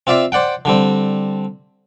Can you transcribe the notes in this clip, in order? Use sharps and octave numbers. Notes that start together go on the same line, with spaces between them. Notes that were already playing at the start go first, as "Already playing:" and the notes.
C4 F4 D5 E5 F5
C5 D5 F#5 G5
D3 G3 C4